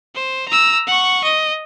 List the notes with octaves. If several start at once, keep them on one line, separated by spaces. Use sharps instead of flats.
C5
A#5 E6
F#5 C#6
D#5